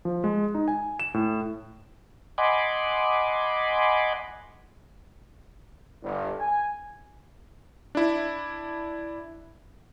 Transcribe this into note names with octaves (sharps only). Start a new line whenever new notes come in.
F3
G#3
D#4
G#5
E7
A2
D#5 F#5 G#5 B5 C6 D6
G1
G#5
D4 E4